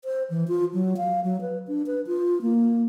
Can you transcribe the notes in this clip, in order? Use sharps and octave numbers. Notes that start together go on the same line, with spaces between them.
C5
E3
F4
F#3
F5
F#3
B4
D4
B4
F4
A#3